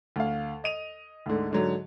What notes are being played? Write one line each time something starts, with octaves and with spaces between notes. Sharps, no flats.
D2 F5
D#5 D#7 F7
D2 G#2 D3
G#2 D3 F#3